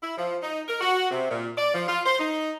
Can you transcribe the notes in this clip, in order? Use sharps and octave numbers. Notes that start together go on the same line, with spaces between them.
E4
F3
D#4
A#4
F#4
C3
A#2
D5
F3
F4
C5
D#4